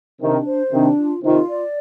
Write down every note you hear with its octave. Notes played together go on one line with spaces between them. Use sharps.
C3 D#3 D4
C5
C3 D#3 D4
F4
C3 D#3 F4
D5